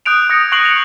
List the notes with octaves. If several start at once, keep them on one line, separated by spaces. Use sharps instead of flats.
D#6 F#6 G6 D7 F7
D#6 F#6 G#6 A#6 C#7
C#6 F#6 C7 D7 F7 F#7
C#7 F7